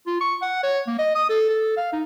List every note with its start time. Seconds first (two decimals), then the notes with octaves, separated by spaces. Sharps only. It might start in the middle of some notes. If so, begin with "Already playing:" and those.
0.07 F4
0.21 C#6
0.42 F#5
0.63 C#5
0.87 A#3
0.99 D#5
1.15 D#6
1.29 A4
1.49 A4
1.77 F5
1.93 D#4